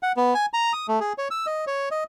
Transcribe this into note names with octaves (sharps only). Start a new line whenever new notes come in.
F#5
B3
G#5
A#5
D#6
A3
G#4
C#5
E6
D#5
C#5
D#5